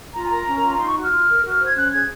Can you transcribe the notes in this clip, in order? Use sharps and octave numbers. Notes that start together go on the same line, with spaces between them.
F4 A#5
G#5
A#4 A#5
C#4
F4
D#4 C6
C#6
F#4
F6
F4
A#4
F#4
C5
G#6
C#4 F#6
G#4 G#6